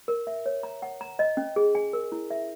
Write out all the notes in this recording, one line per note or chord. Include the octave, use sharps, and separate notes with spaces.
A#4
E5
C#5
A#5
F#5
A#5
D#5
C#4
G#4
G#5
A#4
E4
E5